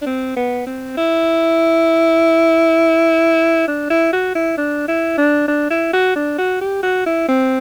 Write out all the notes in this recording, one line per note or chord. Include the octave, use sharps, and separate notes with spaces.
D4
C4
B3
C4
E4
D4
E4
F#4
E4
D4
E4
D4
D4
E4
F#4
D4
F#4
G4
F#4
E4
C4